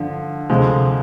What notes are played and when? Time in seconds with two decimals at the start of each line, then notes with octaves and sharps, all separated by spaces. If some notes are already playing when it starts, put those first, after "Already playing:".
Already playing: G2 D3 F3
0.50 D2 C3 F3 G#3